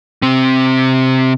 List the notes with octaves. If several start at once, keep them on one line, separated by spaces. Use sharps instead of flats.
C3 C4